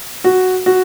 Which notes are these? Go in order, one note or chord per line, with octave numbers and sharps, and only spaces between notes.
F#4
F#4